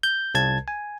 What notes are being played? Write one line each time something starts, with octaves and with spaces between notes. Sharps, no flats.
G6
C2 A5 G#6
G#5